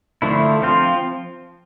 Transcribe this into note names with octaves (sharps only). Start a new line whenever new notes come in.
D3 F3 A3 E4
F3 C4 F4